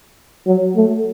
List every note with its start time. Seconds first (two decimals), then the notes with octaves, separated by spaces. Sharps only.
0.47 F#3
0.76 A3